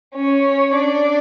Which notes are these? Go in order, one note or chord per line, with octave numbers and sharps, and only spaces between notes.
C#4 C#5
D4 D5